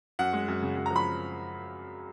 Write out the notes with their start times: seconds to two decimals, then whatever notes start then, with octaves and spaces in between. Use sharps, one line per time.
0.19 F#2 F#5
0.33 G#3
0.48 F#2
0.62 C#3
0.76 F#2
0.86 A#5
0.91 F3
0.96 B5